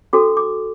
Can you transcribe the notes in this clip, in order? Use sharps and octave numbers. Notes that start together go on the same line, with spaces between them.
D4 F#4 A4 D6
D6